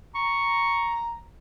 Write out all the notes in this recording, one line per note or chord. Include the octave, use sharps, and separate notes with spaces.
A#5 C#6